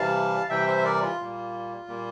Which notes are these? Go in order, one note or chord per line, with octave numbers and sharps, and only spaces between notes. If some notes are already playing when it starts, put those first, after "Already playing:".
Already playing: C3 E3 G3 F5 A5
C3 E3 G3 E5 G5
C5 E5
E5
A#4 D5
F4
A#2 G3 A#3
A#2 G3 A#3